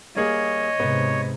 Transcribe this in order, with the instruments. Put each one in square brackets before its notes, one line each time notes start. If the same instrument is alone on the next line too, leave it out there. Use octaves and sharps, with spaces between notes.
[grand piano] G3 A#3 G#4 [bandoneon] C#5 [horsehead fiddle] D#5
[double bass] G#2 C3 [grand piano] B3